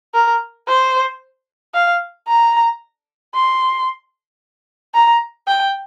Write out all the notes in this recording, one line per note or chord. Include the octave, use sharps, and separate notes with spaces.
A#4
C5
F5
A#5
C6
A#5
G5